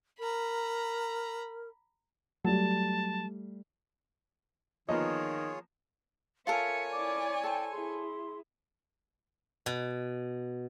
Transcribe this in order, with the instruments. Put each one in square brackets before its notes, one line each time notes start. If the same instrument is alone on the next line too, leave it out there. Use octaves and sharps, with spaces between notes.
[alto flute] A#4 [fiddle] A#5 B5
[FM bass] F#3 [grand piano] G3 A3 [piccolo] A5
[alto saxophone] D#3 [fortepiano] F3 A#3 B3 [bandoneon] F4 G#4 C#5 [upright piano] D#5
[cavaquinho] F4 A4 A#4 [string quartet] C#5 G#5 [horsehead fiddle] E5 [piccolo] C#7
[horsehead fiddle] E4 D5 [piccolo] D6
[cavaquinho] A4 C5 [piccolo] G5
[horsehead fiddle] E4 G#4 [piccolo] C6
[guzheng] B2